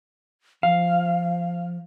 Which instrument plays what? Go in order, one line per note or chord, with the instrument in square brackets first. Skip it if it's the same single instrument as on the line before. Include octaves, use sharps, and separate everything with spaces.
[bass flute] F3 [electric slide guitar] F5